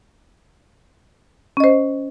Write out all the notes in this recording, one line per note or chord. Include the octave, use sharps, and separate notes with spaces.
C#4 C5 D#5